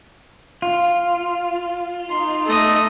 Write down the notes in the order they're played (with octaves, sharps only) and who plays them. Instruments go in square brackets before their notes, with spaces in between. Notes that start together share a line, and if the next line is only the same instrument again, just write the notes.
[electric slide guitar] F4
[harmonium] D#4 [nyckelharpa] C6
[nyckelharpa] A3 D#5